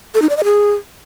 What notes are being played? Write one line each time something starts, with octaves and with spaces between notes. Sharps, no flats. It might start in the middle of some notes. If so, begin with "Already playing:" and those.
A4
D#4
D5
D#5
G#4